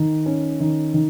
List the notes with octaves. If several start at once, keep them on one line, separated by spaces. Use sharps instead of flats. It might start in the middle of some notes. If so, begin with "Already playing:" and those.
Already playing: D#3
C#4
D#3
D#3